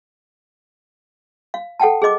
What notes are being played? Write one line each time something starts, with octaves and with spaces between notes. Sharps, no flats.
F5
A4 F#5 G5 A5
G#4 C5 D#5 D6